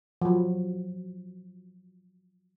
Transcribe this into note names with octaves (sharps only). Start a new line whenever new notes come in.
F3 F#3